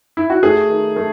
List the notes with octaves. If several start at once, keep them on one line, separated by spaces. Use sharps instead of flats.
E4
F#4
A3 G#4
D#3
A3